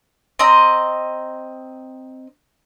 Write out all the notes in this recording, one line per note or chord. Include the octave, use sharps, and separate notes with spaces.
C4 D#5 A#5